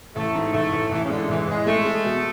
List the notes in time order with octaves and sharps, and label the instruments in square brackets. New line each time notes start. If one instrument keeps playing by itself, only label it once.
[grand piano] A1 [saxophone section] A3
[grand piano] G#2
[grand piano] A1 [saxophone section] A3
[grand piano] A1
[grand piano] A1 [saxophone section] E3
[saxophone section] C#3
[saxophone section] D3 [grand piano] G#3
[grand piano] A1 [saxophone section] E3
[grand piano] A1 [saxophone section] G#3
[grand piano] G#3 [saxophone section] A3
[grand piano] G#3
B2